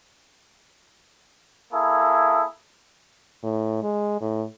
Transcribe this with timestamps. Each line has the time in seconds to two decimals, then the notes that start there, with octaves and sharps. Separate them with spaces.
1.73 A#3 E4 G#4 A4
3.43 A2
3.82 G#3
4.21 A2